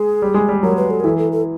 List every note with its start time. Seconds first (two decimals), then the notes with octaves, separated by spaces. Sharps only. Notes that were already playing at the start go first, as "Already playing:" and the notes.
Already playing: G#3 G#4
0.22 G3
0.34 G#3
0.49 G3
0.63 F#3 A#4
0.77 B4
0.90 A4
1.00 A#4
1.04 E3 A4
1.18 A4
1.32 A4